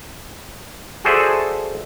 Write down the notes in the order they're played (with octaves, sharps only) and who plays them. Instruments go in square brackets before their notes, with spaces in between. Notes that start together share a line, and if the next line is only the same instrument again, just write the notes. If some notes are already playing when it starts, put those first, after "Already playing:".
[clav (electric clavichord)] F#4 G#4 A4 C5 D5 E5